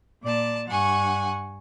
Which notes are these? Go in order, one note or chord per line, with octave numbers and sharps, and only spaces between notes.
A#2 D5 A5
G2 F#5 G#5 C#6